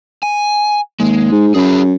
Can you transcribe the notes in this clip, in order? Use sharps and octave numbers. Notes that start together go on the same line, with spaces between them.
G#5
D#2 G#3
G#2
F#2 E4 G#4